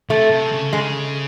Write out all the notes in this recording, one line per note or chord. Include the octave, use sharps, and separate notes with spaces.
C3 A3
C3
C#3
C#3 G#3